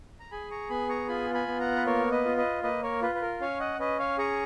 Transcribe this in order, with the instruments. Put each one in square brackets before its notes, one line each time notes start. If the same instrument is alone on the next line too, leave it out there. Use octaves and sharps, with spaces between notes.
[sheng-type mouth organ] A#5
G#4 G#5 B5
A#5 C#6
B3 G#5 B5
A#5 C#6
F4 G#5 B5
G#5 B5
B3
F#5 A#5
B4
A#3 A#4 C#5
B4 D#5
F4
B4 D#5
A#3 B4 D#5
A#4 C#5
F4 B4
B4
A#4
C#4 C#5 F5
D#5 F#5
C#4 B4 D#5
C#5 F5
G#4 A#5 C#6